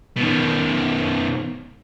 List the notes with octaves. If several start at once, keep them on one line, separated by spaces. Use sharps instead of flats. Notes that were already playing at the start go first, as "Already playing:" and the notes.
B2 D#3